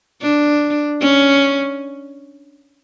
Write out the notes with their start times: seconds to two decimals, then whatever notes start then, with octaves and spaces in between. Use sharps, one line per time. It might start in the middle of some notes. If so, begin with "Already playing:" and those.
0.22 D4
1.01 C#4